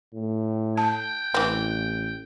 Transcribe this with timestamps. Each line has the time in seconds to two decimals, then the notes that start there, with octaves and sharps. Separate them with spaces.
0.14 A2
0.78 G5 A5
1.34 A1 E3 C4